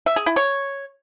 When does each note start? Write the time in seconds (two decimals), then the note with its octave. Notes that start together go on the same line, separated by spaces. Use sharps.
0.06 E5
0.16 G#4
0.26 E4
0.36 C#5